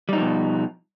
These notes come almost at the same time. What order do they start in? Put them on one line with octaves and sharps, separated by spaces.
G3 D#4 F3 B2